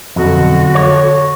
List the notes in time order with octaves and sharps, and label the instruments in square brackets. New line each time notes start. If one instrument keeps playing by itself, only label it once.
[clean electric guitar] B1 F2 [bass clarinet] D3 [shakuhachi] F#4
[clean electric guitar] C#5